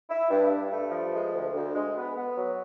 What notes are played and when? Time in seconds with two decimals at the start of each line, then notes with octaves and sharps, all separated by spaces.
0.09 E4
0.31 G2
0.51 G2
0.71 A3
0.92 F3
1.14 G#3
1.33 D2
1.54 D2
1.75 G#3
1.96 B3
2.16 B3
2.37 F#3